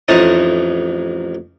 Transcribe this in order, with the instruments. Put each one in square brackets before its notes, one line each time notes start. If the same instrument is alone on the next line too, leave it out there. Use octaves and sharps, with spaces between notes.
[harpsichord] A1 F2 D#4 A5 D#6